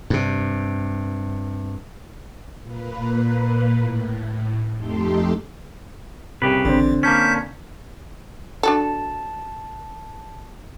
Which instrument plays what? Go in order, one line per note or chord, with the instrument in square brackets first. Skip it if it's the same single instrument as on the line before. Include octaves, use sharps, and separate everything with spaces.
[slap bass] G2 C3
[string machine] A#2 A#3 B4
A2
F2 A3 D#4 G4 A4 C6
[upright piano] C2 [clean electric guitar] C#3 G4 B4
[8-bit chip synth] A1 [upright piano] D3 C4
[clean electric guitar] A#3 C#4 [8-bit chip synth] A5 G6 B6
[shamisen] D4 F#4 A4 [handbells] A5